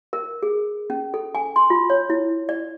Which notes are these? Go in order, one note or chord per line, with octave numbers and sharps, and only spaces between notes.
A#4
G#4
C#4
A4
G#5
C6
F4
C#5
E4
D5